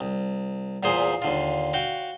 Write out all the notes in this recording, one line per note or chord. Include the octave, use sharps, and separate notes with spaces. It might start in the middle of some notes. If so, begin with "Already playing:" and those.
C2
E2 A#2 F4 G#4 C5
D#2 D3 F4
F#4 F5 G5